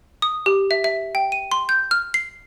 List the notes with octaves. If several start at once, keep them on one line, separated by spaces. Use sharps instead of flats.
D#6
G4
E5
E5
G5
D#7
C6
G6
F6
C7